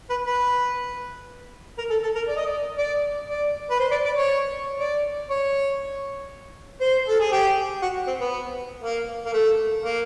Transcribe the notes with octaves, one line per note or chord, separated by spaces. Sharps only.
B4
B4
A#4
A4
A4
A#4
D5
D#5
D5
D5
D5
B4
C5
D5
D5
C#5
D5
C#5
C5
A4
G#4
G4
F#4
C4
B3
A#3
A#3
A3
A#3